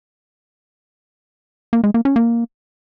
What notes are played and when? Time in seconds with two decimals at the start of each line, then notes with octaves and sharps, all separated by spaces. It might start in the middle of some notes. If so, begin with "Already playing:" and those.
1.73 A#3
1.84 G#3
1.94 A#3
2.05 C#4
2.16 A#3